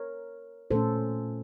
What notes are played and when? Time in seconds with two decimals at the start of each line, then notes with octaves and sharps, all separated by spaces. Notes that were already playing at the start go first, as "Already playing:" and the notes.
Already playing: A#4 C#5
0.71 A#2 A3 C#4 A4 C5